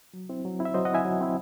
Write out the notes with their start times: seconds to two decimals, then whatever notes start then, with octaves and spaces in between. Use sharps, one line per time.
0.14 F#3
0.29 C4 E4
0.45 F#3
0.59 C4 E4
0.65 E5
0.74 F#3 C5 D#5
0.85 D#5 F#5
0.91 C4 E4 E5 G#5
1.05 F#3
1.21 C4 E4